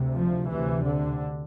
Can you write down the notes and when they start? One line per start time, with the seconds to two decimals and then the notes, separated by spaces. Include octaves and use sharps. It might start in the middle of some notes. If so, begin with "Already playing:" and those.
Already playing: D2 C3
0.14 F3
0.49 D2 C3 E3
0.85 D3